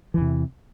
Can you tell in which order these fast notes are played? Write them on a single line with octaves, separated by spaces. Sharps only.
E3 E2 C3